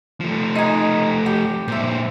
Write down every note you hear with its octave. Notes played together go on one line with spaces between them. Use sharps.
F3 A3
D#4 G#5
G4
A#2 G#3 C5 E5